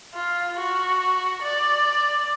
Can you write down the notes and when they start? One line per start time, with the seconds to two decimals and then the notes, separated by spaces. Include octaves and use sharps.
0.14 F4
0.56 F#4
1.42 D5